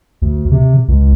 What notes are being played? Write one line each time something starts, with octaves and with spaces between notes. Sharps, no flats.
D2
C3
C#2